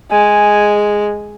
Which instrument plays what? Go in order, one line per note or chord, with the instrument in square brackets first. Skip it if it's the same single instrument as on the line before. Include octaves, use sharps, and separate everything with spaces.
[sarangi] G#3 [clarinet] G#5